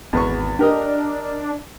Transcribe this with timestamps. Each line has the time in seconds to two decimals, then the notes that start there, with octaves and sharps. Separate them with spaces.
0.13 G#1 E2 B3 C#6
0.59 D4 G4 A#4 D#5